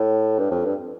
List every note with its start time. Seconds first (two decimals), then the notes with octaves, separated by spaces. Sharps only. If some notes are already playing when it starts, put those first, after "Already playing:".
Already playing: A2
0.39 G2
0.51 F2
0.65 G2